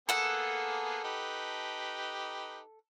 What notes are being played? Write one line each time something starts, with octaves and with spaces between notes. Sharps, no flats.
A#3 B3 G#4 A4 F#5
D#4 G4 B4